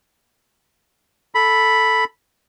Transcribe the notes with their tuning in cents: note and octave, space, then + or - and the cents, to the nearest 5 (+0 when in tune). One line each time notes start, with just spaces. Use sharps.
A4 +0 B5 +0